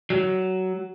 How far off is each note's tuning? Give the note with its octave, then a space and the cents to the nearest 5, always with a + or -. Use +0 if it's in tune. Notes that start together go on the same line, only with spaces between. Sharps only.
F#3 +15